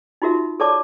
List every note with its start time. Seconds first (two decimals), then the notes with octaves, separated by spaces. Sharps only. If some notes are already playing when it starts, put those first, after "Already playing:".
0.22 D#4 F4 F#4 A#4 E5
0.60 A4 C#5 D5 A5 D6